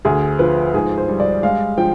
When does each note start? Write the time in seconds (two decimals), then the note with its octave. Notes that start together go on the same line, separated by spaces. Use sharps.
0.05 D2 G#4
0.39 F3 B4
0.74 G#2 G#4
0.98 C5
1.09 G3
1.20 D5
1.43 G#3 F5
1.78 F3 G5